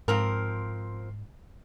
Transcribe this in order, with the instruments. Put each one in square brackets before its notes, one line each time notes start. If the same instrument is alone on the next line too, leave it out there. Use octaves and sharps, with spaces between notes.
[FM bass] G#2 [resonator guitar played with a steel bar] F3 C4 A#4